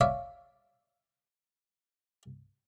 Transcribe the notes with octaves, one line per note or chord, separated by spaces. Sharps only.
C#5 D5 E5 F5